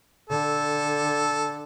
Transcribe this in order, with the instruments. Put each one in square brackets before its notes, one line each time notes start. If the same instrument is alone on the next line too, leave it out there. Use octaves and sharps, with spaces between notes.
[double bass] D3 [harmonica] A4